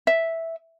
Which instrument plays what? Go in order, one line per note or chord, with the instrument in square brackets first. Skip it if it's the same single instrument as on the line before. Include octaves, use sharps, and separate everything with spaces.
[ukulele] E5